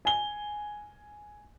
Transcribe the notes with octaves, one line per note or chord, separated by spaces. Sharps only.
G#5 G7